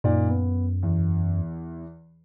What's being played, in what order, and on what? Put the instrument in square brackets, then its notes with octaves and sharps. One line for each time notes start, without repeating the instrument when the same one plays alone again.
[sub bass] F#2 [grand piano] A#2 D#4 D5
[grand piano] B3
E2